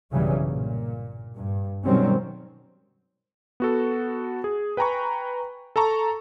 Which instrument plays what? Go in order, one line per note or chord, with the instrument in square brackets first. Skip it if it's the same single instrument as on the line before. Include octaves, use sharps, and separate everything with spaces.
[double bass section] B1 G2 C#3 E3 F#3 G3
A#2
G2
B2 D#3 F#3 G3 C4 C#4
[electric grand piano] B3 F#4 A4
G#4
B4 G5 G#5 A#5 B5 C#6
A4 A5 A#5 C#6